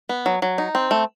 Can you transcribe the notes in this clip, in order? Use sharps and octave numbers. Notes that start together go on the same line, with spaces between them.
B3
F#3
F#3
D#4
C4
A3